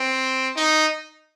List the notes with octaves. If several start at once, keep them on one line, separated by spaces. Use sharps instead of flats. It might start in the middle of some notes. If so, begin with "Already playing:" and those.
Already playing: C4
D#4